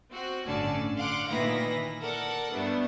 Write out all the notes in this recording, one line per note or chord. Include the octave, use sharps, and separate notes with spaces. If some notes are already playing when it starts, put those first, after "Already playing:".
C4 F#4
G1 A2 D3 C#4 D5 A5
F5 F#5 C6 D6
A#2 D#3 E3 E4 B4 A#6
A4 A#4 D5 F#5
G2 G3 A3 B3 D4